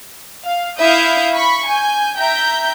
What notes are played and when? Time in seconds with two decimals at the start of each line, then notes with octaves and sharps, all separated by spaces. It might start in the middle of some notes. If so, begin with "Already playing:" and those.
0.46 F5
0.79 E4 E5 F5 D#6 G6
1.34 B5 C#6
1.65 G#5 G6
2.18 E5 G5 A#5 G6